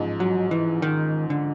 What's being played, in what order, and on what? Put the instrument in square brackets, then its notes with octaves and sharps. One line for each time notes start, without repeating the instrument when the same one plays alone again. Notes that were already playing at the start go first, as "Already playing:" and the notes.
Already playing: [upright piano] A1 G#2 F3
[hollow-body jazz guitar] F#3
E3
D#3
D3